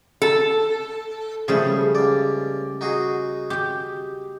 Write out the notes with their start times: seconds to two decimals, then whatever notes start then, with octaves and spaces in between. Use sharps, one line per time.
0.22 A4
1.48 C#3 F3 G3 A3 G#4
1.95 C#2 D5
2.81 D#4 F#4 G#4
3.50 G4 G5